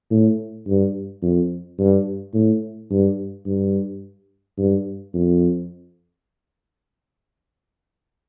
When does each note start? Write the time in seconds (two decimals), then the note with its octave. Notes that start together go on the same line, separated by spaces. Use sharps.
0.11 A2
0.67 G2
1.22 F2
1.79 G2
2.34 A2
2.90 G2
3.46 G2
4.58 G2
5.14 F2